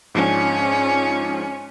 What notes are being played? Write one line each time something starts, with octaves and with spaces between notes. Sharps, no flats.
G#2 F3 C#4 D4